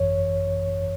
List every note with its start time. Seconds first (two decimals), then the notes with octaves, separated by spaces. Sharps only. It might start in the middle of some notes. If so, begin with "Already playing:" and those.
Already playing: G#1 F#2 E3 C#5